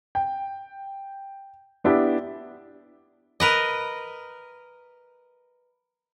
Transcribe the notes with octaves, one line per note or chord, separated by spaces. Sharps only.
G5
B3 D4 E4 G4
A#4 B4 D#5